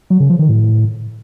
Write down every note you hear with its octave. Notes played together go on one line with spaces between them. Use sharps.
F#3
C#3
F3
D#3
A2